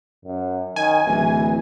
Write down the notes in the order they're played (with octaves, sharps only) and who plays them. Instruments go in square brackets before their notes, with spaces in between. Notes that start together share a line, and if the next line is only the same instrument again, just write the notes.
[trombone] F#2
[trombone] D#3 [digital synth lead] G#5
[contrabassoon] D1 [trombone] E3